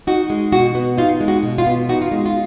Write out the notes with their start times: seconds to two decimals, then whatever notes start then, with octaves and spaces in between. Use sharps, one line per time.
0.07 D#4 F#4
0.30 G#3
0.52 B2 F#4
0.75 B3
0.97 D#4 F4
1.21 G#3
1.28 F#4
1.43 B2
1.58 F4
1.66 B3
1.89 D#4 F#4
2.02 F4
2.12 G#3
2.26 F4